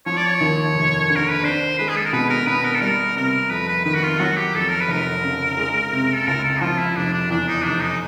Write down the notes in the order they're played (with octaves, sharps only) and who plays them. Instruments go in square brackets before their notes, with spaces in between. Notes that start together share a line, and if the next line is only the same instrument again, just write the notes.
[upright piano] F3 [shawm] C#5
[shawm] D5
C#5
[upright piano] D#2
F1
D3
[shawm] A#4
B4
[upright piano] D4 [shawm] C5
[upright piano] G#3 [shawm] B4
[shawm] G#4
A4
A#4
[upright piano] B2 [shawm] B4
[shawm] A#4
[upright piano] B3 [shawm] B4
[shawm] A#4
A4
[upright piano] G3 [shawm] A#4
[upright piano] C3 [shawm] A#4
[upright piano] F2 [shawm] B4
[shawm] B4
[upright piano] D#3 [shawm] B4
[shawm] F#4
F4
[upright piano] F#3 [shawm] F#4
[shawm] G4
[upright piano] F2 [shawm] A4
[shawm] A#4
B4
[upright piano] F1 [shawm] A#4
[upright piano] C#3
G#3
C3
[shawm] A4
[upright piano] C#2 [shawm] A#4
[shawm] A4
[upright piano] F3 [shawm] F4
[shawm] E4
[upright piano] F1 [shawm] D4
[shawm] D4
[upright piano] E2 [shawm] D4
[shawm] D#4
[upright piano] F1 [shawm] D4
[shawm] D#4